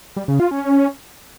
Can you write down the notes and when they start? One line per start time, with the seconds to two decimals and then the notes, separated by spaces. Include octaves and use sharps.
0.17 G3
0.28 C#3
0.40 F4
0.51 C#4